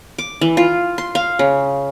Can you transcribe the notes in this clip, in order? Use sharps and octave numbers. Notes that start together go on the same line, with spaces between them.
D6
E3
F4
C6
F5
C#3